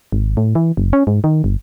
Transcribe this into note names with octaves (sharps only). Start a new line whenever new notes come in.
G#1
A2
E3
F#1
C#4
G#2
D#3
G1